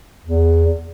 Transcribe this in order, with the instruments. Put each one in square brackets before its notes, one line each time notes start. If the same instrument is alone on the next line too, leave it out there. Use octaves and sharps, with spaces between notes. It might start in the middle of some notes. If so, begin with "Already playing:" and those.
[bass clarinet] E2